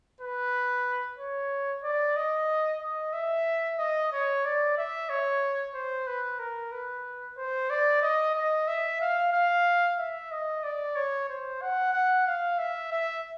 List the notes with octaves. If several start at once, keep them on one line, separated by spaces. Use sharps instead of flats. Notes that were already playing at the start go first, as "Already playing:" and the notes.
B4
C#5
D5
D#5
D#5
E5
D#5
C#5
D5
E5
C#5
C5
B4
A#4
B4
C5
D5
D#5
D#5
E5
F5
F5
E5
D#5
D5
C#5
C5
F#5
F#5
F5
E5
E5